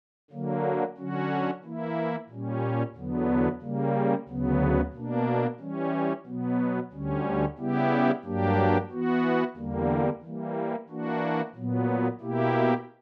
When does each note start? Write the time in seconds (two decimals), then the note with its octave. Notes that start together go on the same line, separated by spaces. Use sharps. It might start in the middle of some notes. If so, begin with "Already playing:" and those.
0.31 D3 F#3 A#3
0.98 D3 F#3 C#4 F#4
1.64 E3 A#3 E4
2.30 A#2 G3 C#4
2.95 E2 D3 F#3 B3
3.62 C#3 G3 A#3
4.28 D2 C#3 F#3 B3
4.93 B2 A#3 D4
5.60 E3 G3 C#4
6.26 B2 F#3 B3
6.92 D2 D3 G3 C#4
7.58 C#3 G3 B3 E4 G4
8.24 G2 F#3 A#3 D4 G4
8.91 E3 B3 F#4
9.57 E2 D3 G3 A#3
10.22 E3 G3 A#3
10.89 E3 A#3 D4 F#4
11.55 A#2 F#3 B3
12.21 B2 A#3 E4 G4